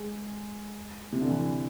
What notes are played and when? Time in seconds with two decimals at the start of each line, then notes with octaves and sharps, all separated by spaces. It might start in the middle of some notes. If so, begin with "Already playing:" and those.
Already playing: G#3
1.13 C3
1.21 D3
1.30 E3